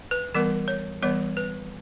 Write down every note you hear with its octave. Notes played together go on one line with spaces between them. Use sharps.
B4
E3 G3 B3 A#4
C#5
E3 G3 B3 C#5
B4